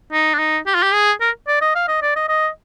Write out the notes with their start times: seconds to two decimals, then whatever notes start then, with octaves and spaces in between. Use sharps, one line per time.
0.12 D#4
0.34 D4
0.39 D#4
0.67 G4
0.75 F4
0.83 G4
0.93 G#4
1.21 A#4
1.48 D5
1.61 D#5
1.75 F5
1.88 D#5
2.02 D5
2.16 D#5
2.29 D#5